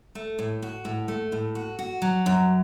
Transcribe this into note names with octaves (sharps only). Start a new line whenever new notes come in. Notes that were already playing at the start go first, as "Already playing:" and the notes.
A3
A2
F#4
A2
A3
A2
F#4
F#4
F#3
F#2